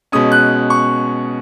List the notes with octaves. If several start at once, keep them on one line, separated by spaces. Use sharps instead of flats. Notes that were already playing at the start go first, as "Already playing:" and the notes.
B2 G#3 C#4 D#6
F#6
C#6